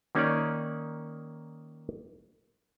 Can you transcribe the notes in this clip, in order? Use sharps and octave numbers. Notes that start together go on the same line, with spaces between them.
D#3 A#3 C#4 D#4 C#5 D5